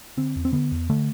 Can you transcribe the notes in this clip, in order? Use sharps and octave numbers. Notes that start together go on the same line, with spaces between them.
D3 C4
E2
C4
D3 B3
E2
D3 A3